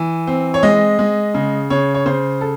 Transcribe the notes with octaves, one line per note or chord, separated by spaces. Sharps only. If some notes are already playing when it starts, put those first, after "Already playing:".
Already playing: E3
C4
C#5
G#3 D#5
G#3
C#3
C#3 C#5
C#5
C#3 C5
A4